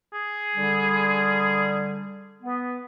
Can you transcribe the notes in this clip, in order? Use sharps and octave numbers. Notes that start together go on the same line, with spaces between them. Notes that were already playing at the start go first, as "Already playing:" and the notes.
G#4
D3 G3
B3